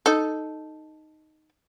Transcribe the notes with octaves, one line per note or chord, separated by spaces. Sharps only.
D#4 A4